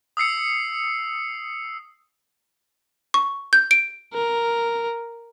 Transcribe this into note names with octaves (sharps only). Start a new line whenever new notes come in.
D#6 E6 C7 C#7
C#6
G6
D7
A#4